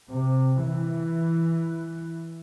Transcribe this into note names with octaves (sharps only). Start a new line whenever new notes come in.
C3
E3